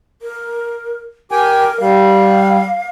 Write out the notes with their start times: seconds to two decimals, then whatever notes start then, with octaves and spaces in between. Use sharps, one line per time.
0.22 A#4
1.32 G4 A#4 G5 G#5
1.80 G3 F5